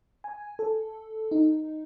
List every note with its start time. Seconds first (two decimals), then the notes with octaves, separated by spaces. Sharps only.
0.24 G#5
0.59 A4
1.31 D#4